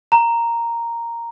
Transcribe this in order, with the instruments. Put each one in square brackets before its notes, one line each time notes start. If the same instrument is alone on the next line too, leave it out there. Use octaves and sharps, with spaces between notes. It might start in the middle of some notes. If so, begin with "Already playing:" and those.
[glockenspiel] A#5